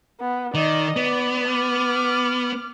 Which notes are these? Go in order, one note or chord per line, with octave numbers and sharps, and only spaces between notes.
B3
D#3 D5 D#5
B3 D5
D6 F6